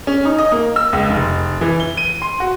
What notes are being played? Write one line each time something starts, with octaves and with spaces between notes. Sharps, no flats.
C#4
D#4
D#5
A#3
E6
C#2
F1
E3
G7
D#7
C6
F#4